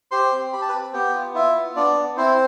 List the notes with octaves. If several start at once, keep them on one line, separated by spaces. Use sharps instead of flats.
G4 C5 C6
C4
G4 B5
A5
C4 B4 B5
B3 G4 G5
F4
E4 F4 E5
B3
B3 D4 D5
B3
C4 E4 C5